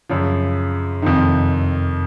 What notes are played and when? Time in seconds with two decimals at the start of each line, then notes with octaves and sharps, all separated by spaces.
0.10 F#2 C#3 F3
1.02 F2 C3 D#3